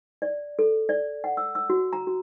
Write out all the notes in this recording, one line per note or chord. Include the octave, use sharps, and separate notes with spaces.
D5
A4
D5
F#5
E6
E6
F#4
A#5
F#4